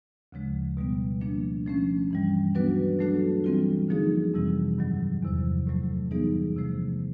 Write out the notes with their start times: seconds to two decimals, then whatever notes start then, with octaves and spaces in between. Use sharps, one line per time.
0.32 D2 C#3 F3 G#3
0.77 B2 G3 B3
1.21 F3 A#3 D4
1.66 F3 A3 C#4
2.11 G2 E3 G3
2.55 F#3 B3 D4 F#4 B4
2.99 F#3 A3 D4 F#4 A4
3.44 E3 G3 C4 F4
3.89 D3 F3 A#3 D#4 G#4
4.34 F2 C3 E3 G3 C4
4.78 G2 D#3 F#3
5.22 E2 C3 F3
5.67 A2 F#3 A3
6.11 E3 G3 B3 D#4 G#4
6.56 C3 F3 A3